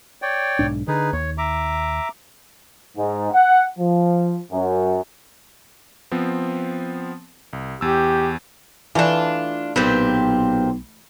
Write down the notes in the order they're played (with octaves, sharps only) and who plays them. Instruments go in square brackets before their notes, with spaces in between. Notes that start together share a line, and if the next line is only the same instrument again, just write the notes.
[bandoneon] C#5 D5 G5
[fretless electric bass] B1 G#2 D4
[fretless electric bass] D3 [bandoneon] D#4 G#4 B4
[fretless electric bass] D#2 [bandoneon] C#5
[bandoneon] E5 A#5 D6
[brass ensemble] G#2
F#5
F3
F#2
[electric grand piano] F3 B3 C4
C2
[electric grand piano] E2 E6 [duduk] G4
[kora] E3 A3 [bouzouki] D4 F4
[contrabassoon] B1 [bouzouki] A#2 C4 G4 [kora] B4